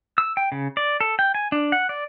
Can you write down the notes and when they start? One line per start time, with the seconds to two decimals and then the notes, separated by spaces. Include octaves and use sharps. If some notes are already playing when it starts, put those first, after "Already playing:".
0.18 E6
0.37 G5
0.52 C#3
0.77 D5
1.01 A4
1.19 G5
1.35 G#5
1.52 D4
1.72 F#5
1.89 D5